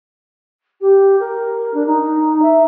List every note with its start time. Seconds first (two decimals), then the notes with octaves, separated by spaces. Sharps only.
0.80 G4
1.19 A#4
1.74 D4
1.86 D#4
2.42 E5